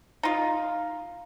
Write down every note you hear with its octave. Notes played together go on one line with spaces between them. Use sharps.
D#4 F4